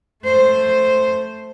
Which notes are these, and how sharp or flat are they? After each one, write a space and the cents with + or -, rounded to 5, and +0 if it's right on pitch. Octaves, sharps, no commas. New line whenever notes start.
A3 +0 C5 +0